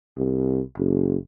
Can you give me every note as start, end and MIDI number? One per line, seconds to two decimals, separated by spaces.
0.17 0.61 36
0.77 1.16 30